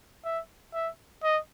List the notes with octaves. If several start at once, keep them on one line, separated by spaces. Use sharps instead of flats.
E5
E5
D#5